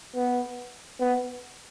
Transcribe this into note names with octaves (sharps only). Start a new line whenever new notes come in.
B3
B3